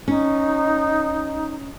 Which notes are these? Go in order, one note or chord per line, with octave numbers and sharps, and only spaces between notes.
C#4 D#4